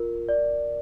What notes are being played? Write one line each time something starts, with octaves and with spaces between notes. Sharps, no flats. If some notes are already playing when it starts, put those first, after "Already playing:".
Already playing: F4 A#4
D5